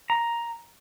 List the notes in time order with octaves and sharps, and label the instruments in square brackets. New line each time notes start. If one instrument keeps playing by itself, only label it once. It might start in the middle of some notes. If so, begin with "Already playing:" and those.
[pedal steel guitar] A#5